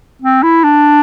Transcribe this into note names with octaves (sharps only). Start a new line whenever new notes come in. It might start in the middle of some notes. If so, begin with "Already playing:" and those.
C4
E4
D4